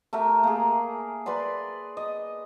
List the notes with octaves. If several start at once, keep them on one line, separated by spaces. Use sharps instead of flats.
A3 G4 A#4 E5
A#3 G#4
B4 D5 B5 C6
D#5